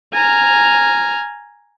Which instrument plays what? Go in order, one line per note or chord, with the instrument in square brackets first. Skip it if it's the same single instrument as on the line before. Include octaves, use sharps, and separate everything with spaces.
[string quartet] G#5 A#5 F6